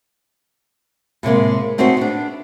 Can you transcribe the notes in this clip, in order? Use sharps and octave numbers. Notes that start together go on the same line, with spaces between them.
A2 C3 G#3 A#3
A3 C4 D#4 F#4 G#4 C5
B3 D4